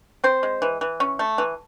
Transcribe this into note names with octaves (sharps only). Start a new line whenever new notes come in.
C4 C5
G#3
E3
E3
C#4
A3
E3